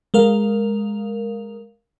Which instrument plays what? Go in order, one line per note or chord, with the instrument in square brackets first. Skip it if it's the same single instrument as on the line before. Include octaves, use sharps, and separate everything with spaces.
[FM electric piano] G#3 A#4 F5